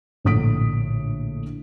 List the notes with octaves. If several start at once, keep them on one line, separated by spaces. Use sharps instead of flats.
A#1 A2 D3 D#6 B6 D7